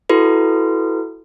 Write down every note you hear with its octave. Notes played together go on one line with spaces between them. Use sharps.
E4 F#4 A4 B4